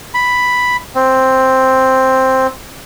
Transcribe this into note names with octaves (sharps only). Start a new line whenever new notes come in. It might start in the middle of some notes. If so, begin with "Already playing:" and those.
B5
C4